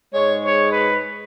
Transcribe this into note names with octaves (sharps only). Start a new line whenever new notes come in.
G#2 G#3 C#5
C#5
B4